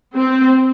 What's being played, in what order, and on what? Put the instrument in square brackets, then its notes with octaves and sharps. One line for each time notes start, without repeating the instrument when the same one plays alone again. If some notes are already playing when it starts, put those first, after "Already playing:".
[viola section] C4